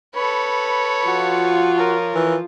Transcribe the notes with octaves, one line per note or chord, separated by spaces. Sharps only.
A4 B4 C#5 B5
F3 F4 F#4
A#4 C#5
E3